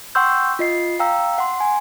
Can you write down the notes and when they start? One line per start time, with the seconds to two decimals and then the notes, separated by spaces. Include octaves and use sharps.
0.15 F#5 G5 C6 C#6 E6 G6
0.59 F4 D#5 C7
0.99 F5 G5 A#5 E6
1.38 F#5 C6
1.60 G#5